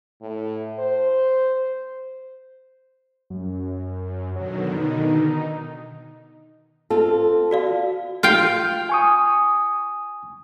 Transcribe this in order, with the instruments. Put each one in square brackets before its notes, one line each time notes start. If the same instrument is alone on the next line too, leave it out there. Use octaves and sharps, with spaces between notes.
[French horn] A2
C5
[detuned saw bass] F#2
[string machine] B2 D3 D#3 [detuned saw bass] F#3
[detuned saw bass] D#4
[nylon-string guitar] C4 F4 A4
[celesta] F#4 D5 F5
[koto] F4 F5 G5
[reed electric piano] G#5 C#6 D#6